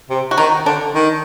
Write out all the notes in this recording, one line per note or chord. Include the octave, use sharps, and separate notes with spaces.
C3
F#4
D#3 D#4
D3 D4
D#3